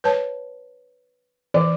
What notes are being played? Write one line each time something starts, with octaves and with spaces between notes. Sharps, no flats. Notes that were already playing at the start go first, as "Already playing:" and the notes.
B4 C#5 A5
E3 D5